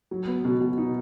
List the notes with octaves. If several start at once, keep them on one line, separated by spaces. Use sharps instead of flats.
F#3
B3
B2
B2
D#4